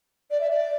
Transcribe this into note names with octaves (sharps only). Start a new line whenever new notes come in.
D5
E5
D5